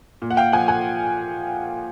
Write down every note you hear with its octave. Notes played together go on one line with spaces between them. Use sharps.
A#2
F#5
F5 G5
F3 F#5 G#5
F#5 G#5